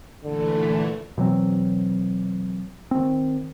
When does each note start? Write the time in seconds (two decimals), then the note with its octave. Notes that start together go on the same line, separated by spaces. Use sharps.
0.24 A#2 D3 E3 A3
1.18 B2 E3 F#3 C4
2.91 D#3 C4